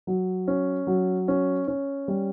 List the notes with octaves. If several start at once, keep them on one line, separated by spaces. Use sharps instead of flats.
F#3
C#4
F#3
C#4
C#4
G3